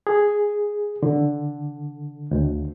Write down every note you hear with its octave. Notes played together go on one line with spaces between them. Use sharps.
G#4
D3
D2